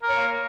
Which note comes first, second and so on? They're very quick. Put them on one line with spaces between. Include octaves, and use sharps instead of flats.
A#4 C#5 A#3